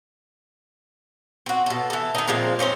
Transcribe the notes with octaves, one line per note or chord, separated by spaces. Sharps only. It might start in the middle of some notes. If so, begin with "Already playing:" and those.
C4 F#4
B2 A4
E3 A4
D#3 D#4
A#2 F3 G#3 C4
C4 C#4 D#4 C5